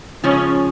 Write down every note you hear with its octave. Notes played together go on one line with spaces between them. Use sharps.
C#3 F3 G#3 C#4